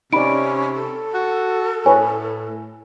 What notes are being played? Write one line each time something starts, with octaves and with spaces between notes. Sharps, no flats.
C3 C#4 D#4 D5 B5 D7
A4
F#4
A2 B4 C#5 G#5